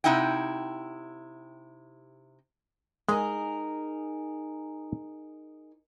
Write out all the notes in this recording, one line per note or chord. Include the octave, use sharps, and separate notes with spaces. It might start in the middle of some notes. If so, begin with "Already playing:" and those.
C3 C#4 D#4 E4 F#5 G5
G#3 D#4 G#4 A#4 G#5